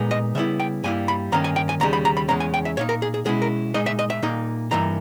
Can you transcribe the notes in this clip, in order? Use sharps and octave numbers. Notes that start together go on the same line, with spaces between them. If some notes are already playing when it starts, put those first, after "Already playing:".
Already playing: A#2 G#3 B3 D#4
D#5
C#3 G3 B3 E4 E5
G5
G2 G3 A#3 E4 G#5
B5
G2 D#3 A#3 C#4 A#5
G#5
G5
G#5
D#2 C#3 G3 A#5
B5
A#5
B5
E2 C#3 G#3 C#4 A#5
G#5
G5
E5
A#2 A#3 D#4 C#5
A#4
G#4
G#4
B2 G#3 C#4 E4 G#4
A#4
A#2 G#3 D#4 D#5
E5
D#5
E5
A#2 A#3 D#4
G2 E3 A#3 D#4 A#5